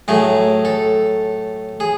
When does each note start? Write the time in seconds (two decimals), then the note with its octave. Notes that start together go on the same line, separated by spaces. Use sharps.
0.08 A2 F#3 A3 G#4
0.65 A4
1.80 G#4